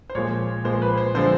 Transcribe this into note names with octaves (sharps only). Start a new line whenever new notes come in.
C5
A#2 F3 G#3 C#5
A#2 F3 G#3 C5
B4
C5
D3 F3 G#3 C5